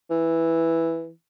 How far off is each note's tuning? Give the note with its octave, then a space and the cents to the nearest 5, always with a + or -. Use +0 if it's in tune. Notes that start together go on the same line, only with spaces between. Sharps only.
E3 +0